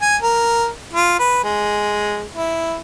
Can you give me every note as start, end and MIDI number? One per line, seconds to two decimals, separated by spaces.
0.02 0.17 80
0.22 0.67 70
0.94 1.16 65
1.19 1.40 71
1.44 2.24 56
2.33 2.77 64